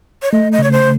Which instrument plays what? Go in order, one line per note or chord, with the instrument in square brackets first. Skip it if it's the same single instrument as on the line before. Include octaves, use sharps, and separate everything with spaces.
[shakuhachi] C#5
[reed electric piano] A3 [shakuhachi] D#5
[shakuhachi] D#5
[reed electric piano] C#3 [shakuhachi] C#5
[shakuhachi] C5